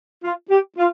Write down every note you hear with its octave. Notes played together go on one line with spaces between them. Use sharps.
F4
G4
F4